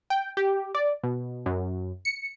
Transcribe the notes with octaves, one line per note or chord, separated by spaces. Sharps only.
G5
G4
D5
B2
F#2
C#7